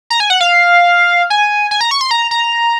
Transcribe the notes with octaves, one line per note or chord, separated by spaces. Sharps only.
A#5
G#5
F#5
F5
G#5
G#5
A#5
C#6
C6
A#5
A#5